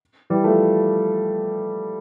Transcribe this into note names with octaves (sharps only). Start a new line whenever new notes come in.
E3 G3
F3 A3